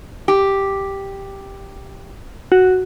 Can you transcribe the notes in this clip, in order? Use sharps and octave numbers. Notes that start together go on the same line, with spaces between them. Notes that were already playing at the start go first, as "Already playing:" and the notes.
G4
F#4